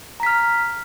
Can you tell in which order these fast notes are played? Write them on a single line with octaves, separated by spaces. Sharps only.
A#5 B6 F6